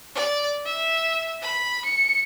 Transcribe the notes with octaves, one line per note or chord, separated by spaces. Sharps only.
D5
E5
B5
C#7